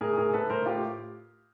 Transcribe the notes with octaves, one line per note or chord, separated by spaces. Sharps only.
A2 G#4 A#4
A2 G#4 A#4
A2 A4 B4
A2 A#4 C5
A2 F4 G4